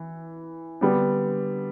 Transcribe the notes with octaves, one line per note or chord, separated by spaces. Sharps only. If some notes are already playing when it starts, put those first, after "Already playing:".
Already playing: E3
D3 G3 B3 D4